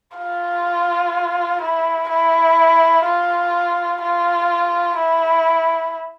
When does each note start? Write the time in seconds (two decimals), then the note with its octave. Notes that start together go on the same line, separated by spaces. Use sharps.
0.17 F4
1.62 E4
2.09 E4
3.05 F4
4.02 F4
4.97 E4